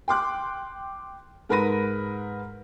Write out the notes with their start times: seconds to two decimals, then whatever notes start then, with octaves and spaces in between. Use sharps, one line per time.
0.08 G5 C6 D6 F#6
1.49 G#2 A#4 B4 B5 A#6 D#7